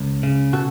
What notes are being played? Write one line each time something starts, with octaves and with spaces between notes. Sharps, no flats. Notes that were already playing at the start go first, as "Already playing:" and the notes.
Already playing: C#2
C#3
B2 F#4 A4